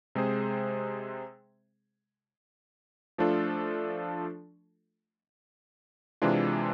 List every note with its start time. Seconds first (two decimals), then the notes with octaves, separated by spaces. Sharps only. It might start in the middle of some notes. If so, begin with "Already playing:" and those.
0.15 C3 G#3 C4 G#4 C5
3.18 F3 A3 D4 F4 A4
6.22 C3 E3 G#3 D4 F4